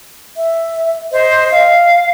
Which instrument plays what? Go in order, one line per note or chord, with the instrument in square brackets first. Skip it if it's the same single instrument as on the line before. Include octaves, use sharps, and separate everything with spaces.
[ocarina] E5
[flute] C5 [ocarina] D#5
[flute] F5